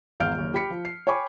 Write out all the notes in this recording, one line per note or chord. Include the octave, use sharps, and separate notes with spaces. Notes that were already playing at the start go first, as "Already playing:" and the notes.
G#1 E2 F5 F6 G6 D7
F#1 D#2
G4 B5 B6 C#7
F3
C7
C#5 G5 G#5 B5 C#6 D6